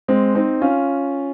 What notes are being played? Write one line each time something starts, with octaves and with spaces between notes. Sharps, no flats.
G#3 C4
C4 D#4
C#4 F4